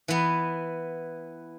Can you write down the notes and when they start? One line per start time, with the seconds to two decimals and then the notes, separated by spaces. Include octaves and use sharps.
0.08 E3 B3